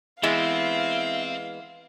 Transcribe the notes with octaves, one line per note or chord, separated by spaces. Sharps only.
E3 G#3 B3 C4 E4 C5 F5